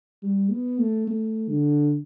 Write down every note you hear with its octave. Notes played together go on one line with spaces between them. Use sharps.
G3
B3
A3
A3
D3